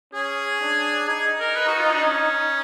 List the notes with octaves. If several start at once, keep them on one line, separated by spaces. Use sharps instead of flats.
C#4 G#4
D4
D#4 G#4
A#4
B4
F#4
F4
D4
C#4